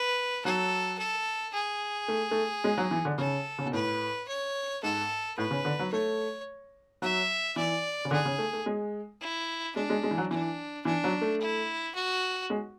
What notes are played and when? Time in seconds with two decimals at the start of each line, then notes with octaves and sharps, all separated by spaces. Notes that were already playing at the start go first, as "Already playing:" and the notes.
Already playing: B4
0.45 F#3 A4
0.99 A4
1.53 G#4
2.08 A3
2.31 A3
2.64 G#3
2.77 F#3
2.91 E3
3.05 D3
3.18 C#3 A4
3.58 C#3
3.66 B2
3.73 A2 B4
4.28 C#5
4.83 G#2 A4
5.38 A2 B4
5.51 C#3
5.65 D3
5.79 F#3
5.93 A3 C#5
7.02 F#3 E5
7.56 E3 D5
8.05 C#3
8.11 D3 G#4
8.25 C#3
8.38 A3
8.53 A3
8.66 G#3
9.21 E4
9.76 G#3 D4
9.90 G#3
10.03 G#3
10.11 E3
10.18 F#3
10.31 E3 D4
10.85 E3 D4
11.04 F#3
11.21 A3
11.41 E4
11.95 F#4
12.50 G#3